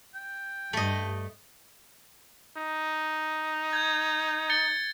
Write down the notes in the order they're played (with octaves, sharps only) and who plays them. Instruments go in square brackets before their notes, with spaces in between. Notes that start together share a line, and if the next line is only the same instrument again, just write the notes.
[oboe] G5
[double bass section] G2 [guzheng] A3 D#5
[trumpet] D#4
[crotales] G6 G#6
A6 C#7 G7